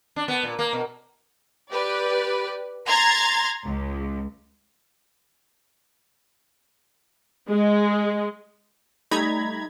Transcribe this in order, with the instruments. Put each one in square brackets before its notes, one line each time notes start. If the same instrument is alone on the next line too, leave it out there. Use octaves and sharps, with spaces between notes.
[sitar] D4
B3
A#2
A#3
B2
[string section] G4 B4 D5
A#5 C6 G#6 A6
C#2
G#3
[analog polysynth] G3 A3 D#4 A#5 B5 G#6